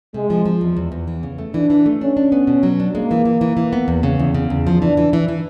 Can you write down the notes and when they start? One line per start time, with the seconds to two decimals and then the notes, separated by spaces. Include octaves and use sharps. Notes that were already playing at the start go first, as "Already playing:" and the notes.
0.14 C3 G#3
0.30 F3
0.45 F3
0.61 E2
0.77 E2
0.92 E2
1.08 E3
1.23 C#3
1.38 A3
1.54 E3 D4
1.70 E3
1.86 A3
2.01 C#4 D4
2.17 D4
2.32 B3
2.47 B2
2.63 F#3
2.80 D4
2.95 G#3 A#3
3.11 E3
3.25 E3
3.41 E3
3.57 E3
3.73 B3
3.88 E2
4.03 C#3
4.19 E2
4.34 C#3
4.50 E2
4.67 F3
4.82 E3 D4
4.97 E3
5.13 E3
5.28 E3